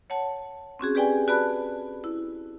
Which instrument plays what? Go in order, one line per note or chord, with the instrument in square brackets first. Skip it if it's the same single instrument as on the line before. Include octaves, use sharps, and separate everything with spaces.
[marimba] C#5 F#5 A5
C4 C#4 F#4 G#4
G4 G#4 B4 D5 G5 G#5
F#4 B4 D5 A5 B5 F#6
E4